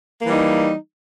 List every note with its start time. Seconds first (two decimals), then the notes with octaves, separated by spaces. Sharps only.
0.22 A#3
0.25 E3
0.29 G3
0.32 D#4